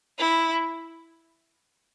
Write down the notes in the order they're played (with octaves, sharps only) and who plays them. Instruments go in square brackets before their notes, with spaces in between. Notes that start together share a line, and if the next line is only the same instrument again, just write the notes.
[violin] E4